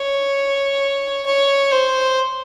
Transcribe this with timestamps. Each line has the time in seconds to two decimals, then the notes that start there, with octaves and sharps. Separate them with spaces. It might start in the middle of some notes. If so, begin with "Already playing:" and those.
Already playing: C#5
1.26 C#5
1.72 C5